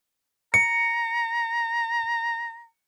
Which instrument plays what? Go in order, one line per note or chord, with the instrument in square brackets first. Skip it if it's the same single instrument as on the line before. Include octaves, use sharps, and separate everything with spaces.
[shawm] A#5 [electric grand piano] C#7